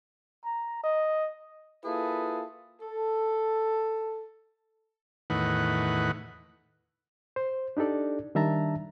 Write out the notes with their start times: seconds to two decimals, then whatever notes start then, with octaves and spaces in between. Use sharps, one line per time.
0.44 A#5
0.83 D#5
1.84 A#3 E4 F4 G#4 A4 B4
2.81 A4
5.30 E2 A2 D#3 B4 F#5
7.36 C5
7.77 D4 D#4 G4 A4 D5
8.35 D#3 G3 D4 E5 A5 A#5